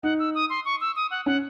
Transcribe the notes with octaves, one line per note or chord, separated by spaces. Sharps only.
D#4 F#5
E6
D#6
C6
C#6
E6
D#6
F#5
C#4 F#5